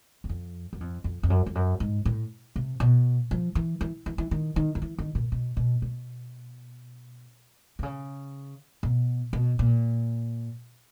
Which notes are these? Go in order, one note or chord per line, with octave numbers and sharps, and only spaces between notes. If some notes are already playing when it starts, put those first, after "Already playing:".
E2
F2
F#2
F2
F2
F2
F#2
F2
F#2
G#2
A2
C3
B2
F3
E3
E3
E3
E3
D#3
D#3
D#3
E3
D#3
A#2
B2
B2
B2
C3
C#3
B2
B2
A#2